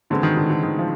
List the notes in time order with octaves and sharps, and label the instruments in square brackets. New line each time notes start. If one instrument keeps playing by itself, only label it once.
[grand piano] A2 E3 G#3 C4 [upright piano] D3
[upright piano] D#3
D3
D3
D#3
F3